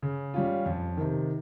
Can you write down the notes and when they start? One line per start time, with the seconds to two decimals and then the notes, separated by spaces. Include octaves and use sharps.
0.02 C#3
0.34 G3 C#4 F4
0.66 F2
0.97 C3 D#3